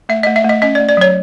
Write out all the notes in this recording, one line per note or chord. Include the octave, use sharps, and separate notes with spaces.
A3 E5
A3 D#5
E5
A3 D#5
C#4 D#5
D5
A3
D5
F#3 C#5